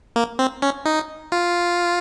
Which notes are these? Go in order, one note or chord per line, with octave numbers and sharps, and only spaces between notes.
A#3
C4
C#4
D#4
F4